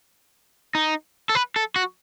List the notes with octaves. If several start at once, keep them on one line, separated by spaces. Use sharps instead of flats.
D#4
A4
B4
A4
F#4